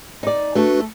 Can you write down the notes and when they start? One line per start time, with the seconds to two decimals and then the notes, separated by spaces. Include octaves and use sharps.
0.23 D#4 D5
0.55 A3 D4 F#4 A4 B4